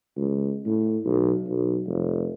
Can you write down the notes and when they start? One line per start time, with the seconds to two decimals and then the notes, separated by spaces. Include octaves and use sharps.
0.17 C#2
0.66 A2
1.05 B1
1.47 B1
1.87 F1